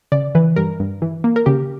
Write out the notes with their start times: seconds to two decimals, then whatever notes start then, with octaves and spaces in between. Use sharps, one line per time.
0.12 C#3 D5
0.35 E3 B4
0.56 G2 A#4
0.80 G2
1.02 E3
1.24 A#3
1.36 A#4
1.46 C#3 G4